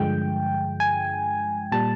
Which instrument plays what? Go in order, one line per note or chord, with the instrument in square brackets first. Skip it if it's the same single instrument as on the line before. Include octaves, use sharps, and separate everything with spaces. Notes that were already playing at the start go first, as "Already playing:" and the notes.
Already playing: [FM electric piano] G2 D3 F3 G#3 G5
G#5
A#2 G3 A5